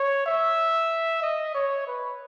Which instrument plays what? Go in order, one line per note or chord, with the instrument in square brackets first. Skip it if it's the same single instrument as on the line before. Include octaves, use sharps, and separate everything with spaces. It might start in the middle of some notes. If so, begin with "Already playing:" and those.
Already playing: [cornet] C#5
E5
D#5
C#5
B4